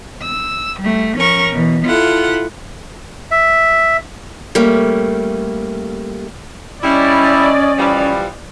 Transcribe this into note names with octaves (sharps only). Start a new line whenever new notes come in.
E6
G3 A3
F3 C#4 A#4 C#6
B2 E3
E4 F4 A4 F#5
E5
G3 A3 A#3 C#4
G3 C#4 E4 D5 D#5
E3 F3 G3